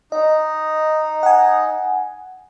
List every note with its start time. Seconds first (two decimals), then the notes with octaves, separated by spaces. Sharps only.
0.12 D#4 D#5
1.23 F#5 G#5